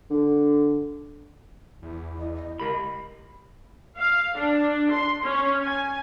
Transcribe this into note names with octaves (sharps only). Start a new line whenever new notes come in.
D3
E2 E4
E4 D#5
D#5
C#2 G4 A#4 B5
F5
D4
C6
C#4
G#5